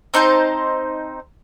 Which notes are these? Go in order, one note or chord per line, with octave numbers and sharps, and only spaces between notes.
C4 D#4 C5 A5